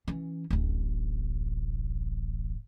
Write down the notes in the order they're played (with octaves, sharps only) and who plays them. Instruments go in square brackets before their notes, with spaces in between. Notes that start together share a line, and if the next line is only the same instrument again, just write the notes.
[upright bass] E3 C#4
D1 A1